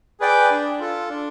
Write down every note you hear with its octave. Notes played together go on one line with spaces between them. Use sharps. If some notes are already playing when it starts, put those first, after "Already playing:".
G#4 B4 D5 G5
D4
F4 A4
D4